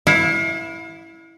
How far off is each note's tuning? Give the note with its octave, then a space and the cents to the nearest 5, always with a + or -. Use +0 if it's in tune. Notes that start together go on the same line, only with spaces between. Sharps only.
E4 +0 F5 +40